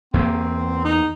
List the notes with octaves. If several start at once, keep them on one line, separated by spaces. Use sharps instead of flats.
E2 A#3 C4
D#4